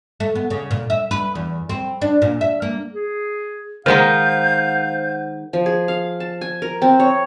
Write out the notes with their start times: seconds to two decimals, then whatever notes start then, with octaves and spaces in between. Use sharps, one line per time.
0.20 A3
0.35 B3
0.50 C#3
0.71 A#2
0.90 E5
1.11 B4
1.35 E2
1.69 C4
2.02 D4
2.22 A#2
2.41 E5
2.62 A#3
2.93 G#4
3.86 D#3 G#3 D#4 C5 F5 F#5 G6
5.53 F3
5.66 G#4
5.88 F5
6.20 A5
6.41 G#5
6.62 A#4
6.82 C4
7.00 C#5